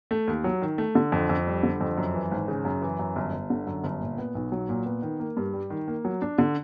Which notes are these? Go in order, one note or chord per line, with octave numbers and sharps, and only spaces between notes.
A3
D#2
F#3
D#3
A3
D3
F2
F2
G3
D3
F2
F#2
E3
G#1
C#3
F#2
E3
F#2
G1
G1
D3
F#2
G1
A#2
B3
B1
F#3
A#2
B3
D#3
A#3
G2
G3
D#3
A#3
F#3
D4
D3